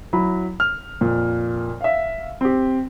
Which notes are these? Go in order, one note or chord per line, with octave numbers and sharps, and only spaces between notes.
F#3 E4 B5
F6
F2 A#2
E5 F5
C4 G4